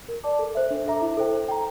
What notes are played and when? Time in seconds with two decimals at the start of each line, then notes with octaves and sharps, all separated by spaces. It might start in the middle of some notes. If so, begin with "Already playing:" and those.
0.08 A#4
0.24 D5 A5 D6
0.39 A4
0.55 C5 E5
0.71 D4
0.86 A4 E5 A#5 D6
1.02 E4
1.17 A4 C5 G5
1.33 C5
1.48 G5 A#5